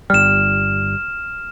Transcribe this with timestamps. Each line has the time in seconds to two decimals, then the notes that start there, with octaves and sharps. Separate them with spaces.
0.10 G1 G3 F6 E7